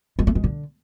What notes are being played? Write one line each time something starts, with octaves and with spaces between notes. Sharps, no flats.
G#3
A3
G#3
D3